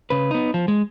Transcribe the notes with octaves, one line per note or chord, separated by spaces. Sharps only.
C#3 B4
B3 D#4
F3
G#3